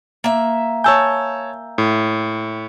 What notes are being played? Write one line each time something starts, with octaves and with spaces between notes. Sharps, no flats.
A#3 E5
C#5 G#5 A5 E6 G6
A2